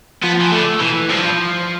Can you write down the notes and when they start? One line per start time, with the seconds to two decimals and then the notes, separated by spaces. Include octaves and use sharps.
0.23 F3 B3
0.41 E3
0.52 D3 A3
0.80 B2 E3
1.10 G2 F3